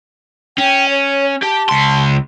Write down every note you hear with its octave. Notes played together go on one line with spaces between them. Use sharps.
C#4 G5
C#5
G4 A5
C#2 C6